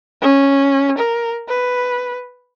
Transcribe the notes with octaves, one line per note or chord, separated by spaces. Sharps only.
C#4
A#4
B4